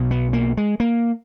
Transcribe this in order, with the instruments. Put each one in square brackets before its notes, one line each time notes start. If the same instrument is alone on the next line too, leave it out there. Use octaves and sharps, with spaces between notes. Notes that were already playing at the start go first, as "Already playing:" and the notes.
Already playing: [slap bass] B1 B2
B3
A#3
G#3
A#3